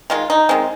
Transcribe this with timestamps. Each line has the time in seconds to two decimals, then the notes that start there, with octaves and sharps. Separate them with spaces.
0.10 D#3 G#3 F4
0.30 D#4
0.49 D#3 G#3 C4